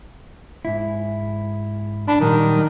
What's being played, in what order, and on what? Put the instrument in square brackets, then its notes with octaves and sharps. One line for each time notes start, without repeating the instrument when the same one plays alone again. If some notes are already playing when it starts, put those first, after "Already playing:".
[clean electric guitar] G#2 E4
[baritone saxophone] D4 [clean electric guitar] B5
[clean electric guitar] A#2 F#3 G3 [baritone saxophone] D#3